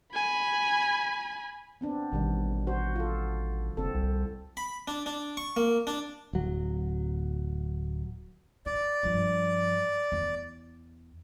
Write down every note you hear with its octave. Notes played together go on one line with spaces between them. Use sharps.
G#5 B5
B3 C4 D4
A1 B2 D#3 G3
F#4 C5
F4 A4
F#1 C4 A4
C2
B5
D4
D4
C#6
A#3
D4
D1 F#3
E4 D5
G2 F3
E2